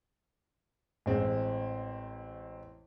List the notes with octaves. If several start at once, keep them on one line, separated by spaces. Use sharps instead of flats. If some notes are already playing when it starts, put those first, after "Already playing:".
A1 G#3 C4